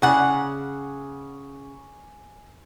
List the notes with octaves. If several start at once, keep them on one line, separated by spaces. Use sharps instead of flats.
C#3 F#5 G#5 D6